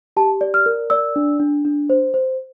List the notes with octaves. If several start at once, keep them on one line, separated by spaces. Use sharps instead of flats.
G4 A5
D5
F6
A#4
D5 E6
D4
D4
D4
C5
C5